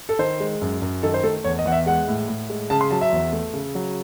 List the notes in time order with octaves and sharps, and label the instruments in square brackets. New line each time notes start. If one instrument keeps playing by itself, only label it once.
[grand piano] A4
D#3 C5
G#3
F#2
F#2
D#3 A4
C5
A3 A4
E2 C#5
D#5
E2 F#5
E5
G#3 F#5
A2
A2
G#3
C#3 A5
C6
F#3 A5
E5
E2
A3
C#3
F#3